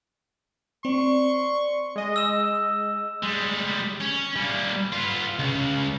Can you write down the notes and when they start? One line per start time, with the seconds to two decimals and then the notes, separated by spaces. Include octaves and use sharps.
0.85 C4 D5 C6 C#6
1.96 G#3 D#5
2.16 E6 E7
3.23 G3 G#3
4.00 C#4
4.36 G3 A#3
4.92 B3 F4
5.39 C#2 C#3